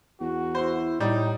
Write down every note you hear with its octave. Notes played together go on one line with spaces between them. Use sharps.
E2 F#4
E4 C5 C6
A2 G3 D#4